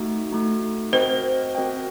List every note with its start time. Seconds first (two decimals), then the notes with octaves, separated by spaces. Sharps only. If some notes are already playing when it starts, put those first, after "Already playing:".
Already playing: A3 D#4 F#4
0.31 A3 D#4 F#4
0.92 C4 F#4 A#4 C5 D#5 G5
1.55 C4 F#4 A#4 D#5 G5